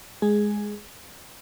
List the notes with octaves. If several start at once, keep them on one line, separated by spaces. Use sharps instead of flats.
G#3 G#4